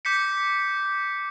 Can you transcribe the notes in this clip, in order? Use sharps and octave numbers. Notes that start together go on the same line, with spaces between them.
D6 G6 B6 C#7